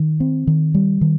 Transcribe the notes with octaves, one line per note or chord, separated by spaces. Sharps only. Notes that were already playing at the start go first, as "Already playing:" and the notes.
Already playing: D#3
C4
D#3
G3
D#3